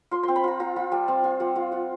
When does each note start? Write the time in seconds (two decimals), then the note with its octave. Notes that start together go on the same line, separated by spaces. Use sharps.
0.11 F4 C6
0.23 C4 C6
0.36 B5
0.44 F4 A#5
0.60 F4 A#5
0.76 F4 B5
0.92 G3 A5
1.08 C4 A5
1.24 F4 G#5
1.40 G3 F#5
1.56 F4 F5
1.72 F4 F#5